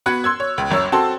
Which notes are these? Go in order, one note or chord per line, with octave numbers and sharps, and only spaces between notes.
B3 F#4 F#5 B5 F#6 G#6
C6 E6 G#6
C#5
C#2
F#1 F#2 C#5 E6
C4 F#4 A4 A5 C6